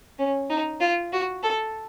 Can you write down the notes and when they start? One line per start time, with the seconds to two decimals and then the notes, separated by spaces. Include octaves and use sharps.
0.19 C#4
0.50 D#4
0.80 F4
1.13 F#4
1.43 A4